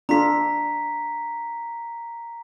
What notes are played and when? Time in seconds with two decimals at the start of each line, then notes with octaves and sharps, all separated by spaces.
0.09 D4 F4 A4 A#5 B6